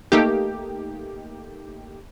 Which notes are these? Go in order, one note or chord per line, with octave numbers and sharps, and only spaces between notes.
A3 A#3 D#4 G4